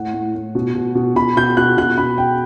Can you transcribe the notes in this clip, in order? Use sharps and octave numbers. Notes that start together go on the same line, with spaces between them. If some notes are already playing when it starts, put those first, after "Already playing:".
Already playing: A2 F#5
A2
A2
B2
B2
B2
B2 B5
B2 G6
B2 F#6
B2 F#6
B2 B5
B2 G5